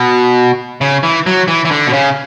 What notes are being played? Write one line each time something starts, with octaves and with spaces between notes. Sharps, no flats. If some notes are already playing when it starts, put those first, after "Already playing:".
Already playing: B2
C#3
E3
F#3
E3
E3
D3
B2
C#3